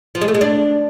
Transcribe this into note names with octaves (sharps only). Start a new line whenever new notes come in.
F3
G#3
A3
G#3
D4